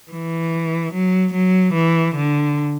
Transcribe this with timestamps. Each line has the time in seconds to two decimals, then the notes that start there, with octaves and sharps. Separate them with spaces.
0.12 E3
0.94 F#3
1.34 F#3
1.74 E3
2.16 D3